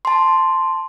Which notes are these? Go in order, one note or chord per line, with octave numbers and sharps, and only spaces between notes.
A5 C6